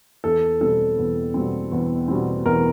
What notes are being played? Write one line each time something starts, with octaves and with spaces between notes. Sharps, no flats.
E2 A4
B2 G3 C4 A4
E2
B2 G3 C4
E2
B2 G3 C4
E2 A#4